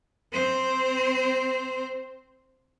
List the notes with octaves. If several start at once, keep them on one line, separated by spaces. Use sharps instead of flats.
C4 C5